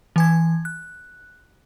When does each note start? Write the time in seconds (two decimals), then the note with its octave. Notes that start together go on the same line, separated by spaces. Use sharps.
0.16 E3 G#5 G#6
0.65 F#6